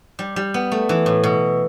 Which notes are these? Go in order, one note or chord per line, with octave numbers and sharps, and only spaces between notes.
G3
G3
B3
A3
E3
A2
B2